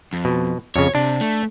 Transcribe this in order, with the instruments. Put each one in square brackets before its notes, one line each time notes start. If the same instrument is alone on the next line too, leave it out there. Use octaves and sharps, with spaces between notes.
[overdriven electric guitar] F2
[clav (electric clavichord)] B2
[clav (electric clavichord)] F2 C#3 [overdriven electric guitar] C#5
[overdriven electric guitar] C3 [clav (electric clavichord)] D4
[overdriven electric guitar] A3